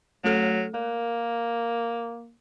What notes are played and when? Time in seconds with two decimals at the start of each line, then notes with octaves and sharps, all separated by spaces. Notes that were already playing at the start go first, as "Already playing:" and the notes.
0.24 F#3 A3 A4
0.74 A#3 A#4